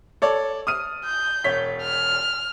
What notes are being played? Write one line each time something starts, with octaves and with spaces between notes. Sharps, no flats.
A4 C#5 D5
D#6 F6 D#7
G6
E1 C#5 B6
F6